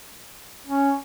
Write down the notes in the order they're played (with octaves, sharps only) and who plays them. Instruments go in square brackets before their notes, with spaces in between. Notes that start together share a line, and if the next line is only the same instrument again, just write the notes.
[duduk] C#4